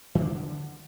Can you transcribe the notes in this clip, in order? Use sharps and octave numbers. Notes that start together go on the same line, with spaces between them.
D#3
D4
D3